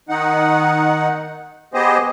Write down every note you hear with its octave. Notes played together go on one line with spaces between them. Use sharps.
D#3 D#4 F#5
B3 G4 G#4 C5 D#5